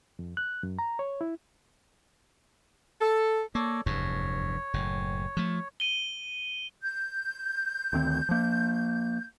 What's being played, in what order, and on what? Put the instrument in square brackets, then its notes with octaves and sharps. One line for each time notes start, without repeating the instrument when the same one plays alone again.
[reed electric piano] F2
F#6
F#2
A#5
C#5
E4
[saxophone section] A4
[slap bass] A#3 [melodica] A4 C#5 D5
[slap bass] F1 E2 G2 [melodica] C#5
[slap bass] F#1 A2
F3 A3
[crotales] D#7 G7
[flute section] G6
[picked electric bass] D2 D#3 C4
F3 A#3